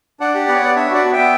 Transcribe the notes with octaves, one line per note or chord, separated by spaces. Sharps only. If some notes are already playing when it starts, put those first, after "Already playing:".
D4 D5 F#5
G4
B3
C#5
B3 D5
D4 C#5 E5
F#4 D5 F#5
B3
E5 G5
B3